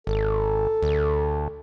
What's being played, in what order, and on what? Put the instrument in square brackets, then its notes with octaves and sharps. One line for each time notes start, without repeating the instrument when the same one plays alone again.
[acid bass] G#1 [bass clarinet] A4
[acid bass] D2